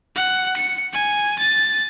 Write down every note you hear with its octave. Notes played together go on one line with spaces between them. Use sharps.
F#5
C#7
G#5
A6